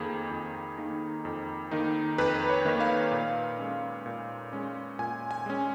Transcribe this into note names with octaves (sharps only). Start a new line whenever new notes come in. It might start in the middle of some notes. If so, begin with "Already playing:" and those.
Already playing: F2 D#3 A#3 D#4 G#4
F2
D#3 A#3 D#4
F2
D#3 A#3 D#4
F2 B4
C#5
D#3 A#3 D#4
F5
A#2
G#3 C#4
A#2
G#3 C#4
A#2 G#5
G#5
G#3 C#4